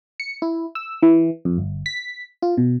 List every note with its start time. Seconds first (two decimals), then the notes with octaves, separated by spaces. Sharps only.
0.20 C#7
0.42 E4
0.75 E6
1.03 E3
1.45 F2
1.58 G1
1.86 B6
2.42 F4
2.57 B2